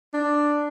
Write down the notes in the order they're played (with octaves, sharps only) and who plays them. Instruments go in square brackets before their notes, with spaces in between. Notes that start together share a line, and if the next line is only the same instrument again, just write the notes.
[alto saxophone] D4